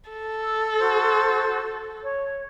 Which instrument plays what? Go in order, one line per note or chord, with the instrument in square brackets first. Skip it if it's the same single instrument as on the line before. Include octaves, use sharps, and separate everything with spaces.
[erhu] A4
[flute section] E6
F#4 C5
C#5